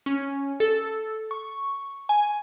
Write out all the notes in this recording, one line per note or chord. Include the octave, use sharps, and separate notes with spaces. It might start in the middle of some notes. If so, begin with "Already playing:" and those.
C#4
A4
C#6
G#5